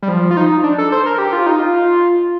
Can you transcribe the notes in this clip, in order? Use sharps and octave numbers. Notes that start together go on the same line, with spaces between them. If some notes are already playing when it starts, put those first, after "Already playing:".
G3
F3
F4
D#4
D4
A4
C5
A#4
G4
F4
D#4
F4